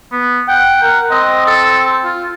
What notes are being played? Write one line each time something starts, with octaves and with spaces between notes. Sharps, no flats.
B3
F#5 G5
A#4
C4 D#5
A4
F4